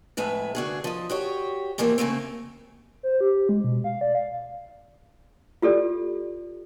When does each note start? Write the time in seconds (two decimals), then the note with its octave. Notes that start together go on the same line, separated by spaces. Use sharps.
0.17 F2 A2 G#3 B4 E5
0.55 D3 F#4 G#4
0.84 F3 D#5
1.10 F#4 G4 C#5
1.78 A2 E3 F3 A3 A#3 G4
1.98 C#3 A3 A#3 C4
3.03 C5
3.21 G4
3.49 G#3
3.64 B2
3.84 F5
4.01 D5
4.15 F5
5.62 F4 G4 A4 D5